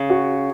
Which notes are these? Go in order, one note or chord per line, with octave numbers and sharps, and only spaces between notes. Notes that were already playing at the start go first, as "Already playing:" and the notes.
Already playing: C#3
F#4